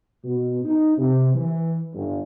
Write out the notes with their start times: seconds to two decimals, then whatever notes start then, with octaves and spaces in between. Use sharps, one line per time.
0.24 B2
0.63 D#4
0.97 C3
1.34 E3
1.94 G1